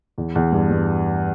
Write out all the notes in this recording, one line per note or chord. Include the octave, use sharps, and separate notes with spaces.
E2
E2
G2
G2